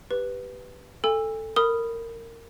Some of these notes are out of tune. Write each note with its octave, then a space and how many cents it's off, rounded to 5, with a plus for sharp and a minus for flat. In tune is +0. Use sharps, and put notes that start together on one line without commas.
G4 +0 B4 +0
A4 +5 G#5 -40 E6 +5
A#4 -20 B5 +0 D#6 +0